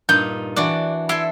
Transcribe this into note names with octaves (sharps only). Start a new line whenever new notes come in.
G2 A#2 D#4 G6
E3 D4 F#4 D5
E4 A4 E5 C6